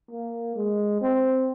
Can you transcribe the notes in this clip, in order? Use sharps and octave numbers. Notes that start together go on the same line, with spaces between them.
A#3
G#3
C4